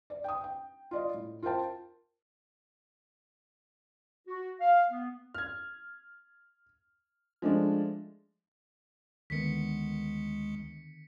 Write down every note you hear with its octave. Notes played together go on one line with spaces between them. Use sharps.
D5
G5 D#6
G5
F4 D5 D#5
A2
F4 A#4 C5 G5 A5
F#4
F5
B3
F6 G#6
F3 G#3 A3 D4
D2 D3 D#3 G#3 B3 B6 C#7